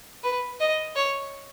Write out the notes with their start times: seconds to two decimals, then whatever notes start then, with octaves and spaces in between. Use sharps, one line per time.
0.24 B4
0.60 D#5
0.96 C#5